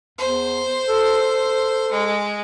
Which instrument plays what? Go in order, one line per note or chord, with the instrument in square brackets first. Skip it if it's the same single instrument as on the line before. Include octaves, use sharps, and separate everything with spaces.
[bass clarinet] E2 [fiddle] C5
[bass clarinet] A4
A4
[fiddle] G#3